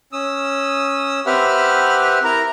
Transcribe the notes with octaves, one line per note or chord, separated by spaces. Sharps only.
C#4 D#6 E6
C4 G4 B4 E5 F#5 F6
E4 A#4 A#5